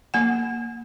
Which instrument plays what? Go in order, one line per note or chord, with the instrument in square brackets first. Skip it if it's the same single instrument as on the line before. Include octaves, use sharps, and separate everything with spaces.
[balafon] A#3 F#5